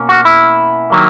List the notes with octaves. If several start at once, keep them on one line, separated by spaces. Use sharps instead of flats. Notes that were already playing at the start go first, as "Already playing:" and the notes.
Already playing: B2 A#3 C#4
F#4
E4
D#3 F#3 A#3